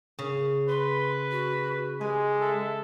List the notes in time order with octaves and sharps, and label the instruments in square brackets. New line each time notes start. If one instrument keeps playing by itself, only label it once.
[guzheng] C#3
[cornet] B4 [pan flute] C6
[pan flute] F#4
[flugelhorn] G#3 [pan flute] G4 [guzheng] G#5
[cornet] A4 [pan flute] E5